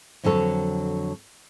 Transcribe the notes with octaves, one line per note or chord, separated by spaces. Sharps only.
F2 D3 F#3 A4 C#5